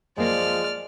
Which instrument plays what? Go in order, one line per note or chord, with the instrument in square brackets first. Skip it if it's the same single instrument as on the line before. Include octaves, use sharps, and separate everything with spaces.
[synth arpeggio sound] F#2 A#3 [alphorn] F3 [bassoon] G#3 [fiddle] D5 F6